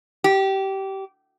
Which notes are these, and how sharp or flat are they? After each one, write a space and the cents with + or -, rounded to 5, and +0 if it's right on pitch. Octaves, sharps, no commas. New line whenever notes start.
G4 -20